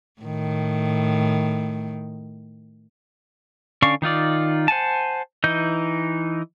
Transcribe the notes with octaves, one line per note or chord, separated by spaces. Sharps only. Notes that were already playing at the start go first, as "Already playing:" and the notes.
A2 D#3
D3 C#4 D5 F5 C#6
D#3 D#4 F4 D5
C5 F#5 G#5 A5
E3 D#4 D#5 G6